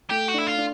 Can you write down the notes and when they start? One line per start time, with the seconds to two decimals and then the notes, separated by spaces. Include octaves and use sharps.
0.10 A3 G4
0.29 F#4
0.34 D4 E4
0.47 F4
0.58 D4